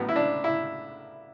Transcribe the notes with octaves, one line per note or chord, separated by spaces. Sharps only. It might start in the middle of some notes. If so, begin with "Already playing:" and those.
Already playing: A1 A2 F#3 B3
E4
D4
E4